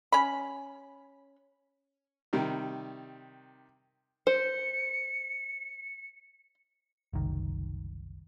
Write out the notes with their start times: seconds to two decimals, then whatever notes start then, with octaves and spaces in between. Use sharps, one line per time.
0.12 C#4 B5
2.33 C3 D#3 G3
4.27 C5 C#7
7.13 F#1 C2 D#3